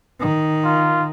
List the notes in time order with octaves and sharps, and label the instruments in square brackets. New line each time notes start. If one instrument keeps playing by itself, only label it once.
[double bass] D#3
[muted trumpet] F4